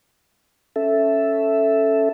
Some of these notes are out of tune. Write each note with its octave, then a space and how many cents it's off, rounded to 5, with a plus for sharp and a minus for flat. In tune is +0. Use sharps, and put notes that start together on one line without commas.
C#4 +0 A4 +0 E5 +0